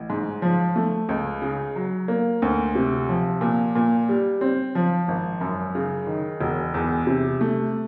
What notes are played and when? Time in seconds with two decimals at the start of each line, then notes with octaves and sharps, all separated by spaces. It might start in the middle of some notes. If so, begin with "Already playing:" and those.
Already playing: A1
0.10 G#2
0.42 F3
0.76 A3
1.09 C#2
1.42 C#3
1.76 F#3
2.08 A#3
2.42 D2
2.75 C3
3.09 F3
3.41 A#2
3.76 A#2
4.09 G3
4.41 C4
4.75 F3
5.08 G#1
5.41 F#2
5.75 C#3
6.07 D#3
6.40 E1
6.74 E2
7.07 C3
7.41 A3